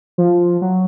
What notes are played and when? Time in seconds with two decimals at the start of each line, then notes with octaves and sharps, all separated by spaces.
0.18 F3
0.62 F#3